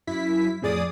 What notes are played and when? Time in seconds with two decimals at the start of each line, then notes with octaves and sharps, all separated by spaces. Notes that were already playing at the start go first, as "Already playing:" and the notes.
0.07 F#2 E4 B6
0.62 F2 A2 G#4 D5 D#6